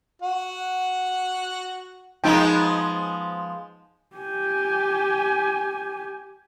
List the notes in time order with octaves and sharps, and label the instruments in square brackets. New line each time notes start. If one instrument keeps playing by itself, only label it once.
[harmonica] F#4 F#5
[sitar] F3 G#3 B3 [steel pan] D#4 G5
[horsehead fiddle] G4 G#5